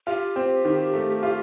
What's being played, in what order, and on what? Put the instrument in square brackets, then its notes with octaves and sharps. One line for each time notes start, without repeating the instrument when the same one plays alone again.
[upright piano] F4 [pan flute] G4
[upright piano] C4
D#3
A3
F4